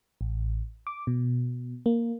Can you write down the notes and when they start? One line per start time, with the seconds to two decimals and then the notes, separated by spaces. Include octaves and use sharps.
0.21 A1
0.87 D6
1.07 B2
1.86 A#3